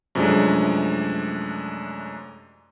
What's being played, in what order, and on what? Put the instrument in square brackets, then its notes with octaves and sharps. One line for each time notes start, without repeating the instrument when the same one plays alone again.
[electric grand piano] F#2 C3 F3 G#3 A3 D4